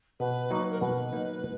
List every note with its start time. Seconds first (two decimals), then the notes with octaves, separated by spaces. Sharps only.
0.20 B2 B4
0.51 F#3 A#3 D#4
0.71 A#4
0.81 B2 B4
1.13 F#3 A#3 D#4